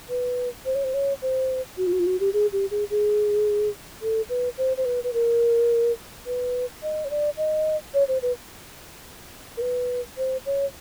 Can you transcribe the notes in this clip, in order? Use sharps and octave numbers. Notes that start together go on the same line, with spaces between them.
B4
C5
C#5
C5
C#5
C5
F#4
F4
F#4
F4
F#4
G4
G#4
G4
G#4
G#4
A4
B4
C5
C5
B4
B4
A#4
B4
D#5
C#5
D5
D#5
C#5
C5
B4
A#4
B4
C5
C#5